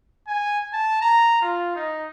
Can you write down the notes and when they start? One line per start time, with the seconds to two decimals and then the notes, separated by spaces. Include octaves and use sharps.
0.28 G#5
0.73 A5
1.02 A#5
1.42 F4
1.76 D#4